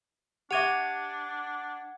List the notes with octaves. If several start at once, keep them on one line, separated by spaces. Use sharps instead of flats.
D4 G4 E5 F#5 D6 G#6 D#7 F7